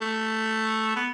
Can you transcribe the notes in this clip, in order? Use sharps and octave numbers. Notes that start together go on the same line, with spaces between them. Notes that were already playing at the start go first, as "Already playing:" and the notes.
A3
B3